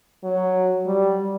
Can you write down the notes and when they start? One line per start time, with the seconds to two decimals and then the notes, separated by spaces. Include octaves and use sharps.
0.23 F#3
0.86 G3